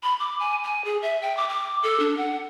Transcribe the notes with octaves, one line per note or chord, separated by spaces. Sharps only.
B5
D6
G#5
G#5
G#4
E5
G5
D6
D6
A4
D4
F#5